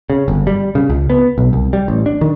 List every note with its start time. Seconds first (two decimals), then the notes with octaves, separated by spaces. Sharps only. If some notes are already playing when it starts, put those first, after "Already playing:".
0.10 C#3
0.28 G1
0.47 G3
0.75 C#3
0.90 C#2
1.10 B3
1.38 B1
1.53 C2
1.73 G3
1.88 A1
2.06 D4
2.21 D#3